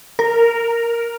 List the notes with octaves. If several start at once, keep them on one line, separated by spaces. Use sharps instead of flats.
A#4